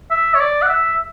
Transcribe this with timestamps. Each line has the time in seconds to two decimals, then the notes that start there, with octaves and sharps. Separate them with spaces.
0.11 E5
0.35 C#5
0.40 D5
0.62 F#5
0.69 E5